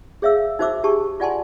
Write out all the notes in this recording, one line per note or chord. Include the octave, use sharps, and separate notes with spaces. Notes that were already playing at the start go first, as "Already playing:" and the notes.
G#4 C#5 E5 F5 E6
D#4 F#4 C5 E5 D6 E6
D4 G4 G#4 A5 C#6
F4 D5 F#5 G#5 A5 C6